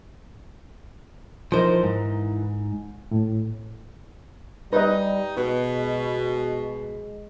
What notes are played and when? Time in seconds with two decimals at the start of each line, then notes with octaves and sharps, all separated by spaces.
1.52 E3 F3 D#4 A#4 C5
1.83 G#2
3.11 A2
4.73 G3 D#4 B4 D#5
5.37 B2 G#3